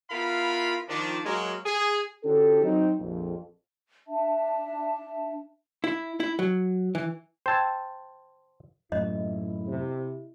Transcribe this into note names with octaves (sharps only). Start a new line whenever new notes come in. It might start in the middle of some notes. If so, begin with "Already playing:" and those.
B3 E4 F4 A#4 F5 B5
D#3 F3 D4
F#3 G#3 A#3
G#4
D3 C#4 E4 F#4 G4 A4
F#3 C4 D#4
A#1 F2
D4 E5 A5
E4
E4
F#3
E3
C5 G5 A5 E6 G#6
F#2 A2 E4 D#5
C3